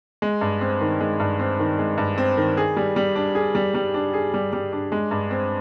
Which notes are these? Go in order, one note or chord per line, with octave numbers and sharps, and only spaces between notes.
G#3
G2
C4
D#3
G#3
G2
C4
D#3
G#3
G2
C4
D#3
G#4
G3
G3
D4
G#4
G3
G3
D4
G#4
G3
G3
D4
G#3
G2
C4